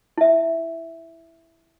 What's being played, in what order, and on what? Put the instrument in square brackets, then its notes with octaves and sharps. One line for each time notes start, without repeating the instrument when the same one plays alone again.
[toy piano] E4 E5